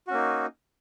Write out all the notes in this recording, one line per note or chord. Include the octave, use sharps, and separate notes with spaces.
A#3 C#4 D#4 F#4